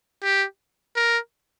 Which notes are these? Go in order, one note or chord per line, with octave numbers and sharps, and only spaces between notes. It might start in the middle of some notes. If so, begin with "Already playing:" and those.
G4
A#4